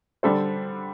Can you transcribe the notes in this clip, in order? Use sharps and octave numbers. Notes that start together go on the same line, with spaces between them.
D3 G3 D4 A4 C5